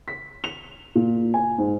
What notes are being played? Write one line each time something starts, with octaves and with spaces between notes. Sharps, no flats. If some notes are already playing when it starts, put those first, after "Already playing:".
B6
F7
A#2
G#5
G#2